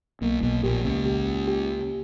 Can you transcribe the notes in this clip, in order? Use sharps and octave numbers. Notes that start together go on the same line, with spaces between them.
B1 B2 A#3
B1 B2
A#1 A#2 G4
C#2 C#3
G4
G4